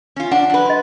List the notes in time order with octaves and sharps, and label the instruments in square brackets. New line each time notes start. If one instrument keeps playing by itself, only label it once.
[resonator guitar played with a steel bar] C#4 F4
[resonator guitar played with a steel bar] D4 [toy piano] F#5
[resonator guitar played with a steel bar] F#3 B4
[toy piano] D#5 C6